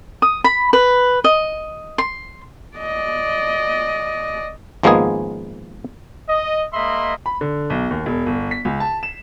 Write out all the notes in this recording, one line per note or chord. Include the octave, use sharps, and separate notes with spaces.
D#6
B5
B4
D#5
C6
D5 D#5
G#1 F3 G#3 A#3 B3 G#4
D#5
G#3 A#3 D#5 E5 B5 C6
B5
D3
B1
D#2
E1
G1
B6
C#2
A5
E7